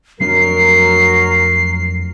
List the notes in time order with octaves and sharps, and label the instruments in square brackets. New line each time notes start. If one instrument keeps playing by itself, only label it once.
[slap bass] F2 A3 D4 [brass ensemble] F#3 A#4 [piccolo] C7